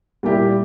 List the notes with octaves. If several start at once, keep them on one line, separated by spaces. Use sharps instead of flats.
A#2 G3 A#3 E4 G4